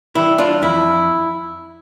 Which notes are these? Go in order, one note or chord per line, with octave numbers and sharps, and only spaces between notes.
E3 G3 E4
D4 F4
F2 E4